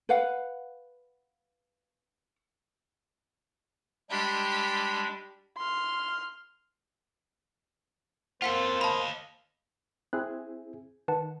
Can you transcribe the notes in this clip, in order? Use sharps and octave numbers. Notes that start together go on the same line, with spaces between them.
B4 F5 F#5
G3 G#3 D4 G4 B5
C6 F6
A#3 F4 A4 C5 F#5 B6 C#7
D#5 F5 A5 B5
C4 E4 G#4 F#6
D#3 B4 F#5 A5